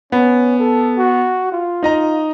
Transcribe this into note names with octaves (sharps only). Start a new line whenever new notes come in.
B3 C#4
A4
F#4
F4
D#4 D#5 A#5